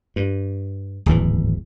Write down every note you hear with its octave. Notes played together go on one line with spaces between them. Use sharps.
G2
D1 G#1 E2 E3